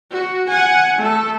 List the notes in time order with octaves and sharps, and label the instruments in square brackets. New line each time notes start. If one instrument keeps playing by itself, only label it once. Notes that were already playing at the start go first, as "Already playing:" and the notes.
[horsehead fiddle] F#4
F#5 G#5
A3 A4